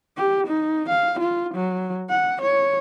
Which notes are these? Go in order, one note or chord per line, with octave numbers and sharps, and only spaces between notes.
G4
D#4
F5
F4
F#3
F#5
C#5